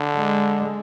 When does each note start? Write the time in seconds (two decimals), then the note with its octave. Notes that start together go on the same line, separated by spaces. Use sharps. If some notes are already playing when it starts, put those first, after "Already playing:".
Already playing: D3
0.16 G#3